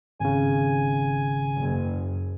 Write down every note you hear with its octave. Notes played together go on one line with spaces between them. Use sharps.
G#1 C#3 G#5
F#1